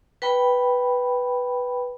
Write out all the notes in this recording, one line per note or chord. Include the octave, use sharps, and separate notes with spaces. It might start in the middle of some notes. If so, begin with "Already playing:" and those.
B4 G5 B5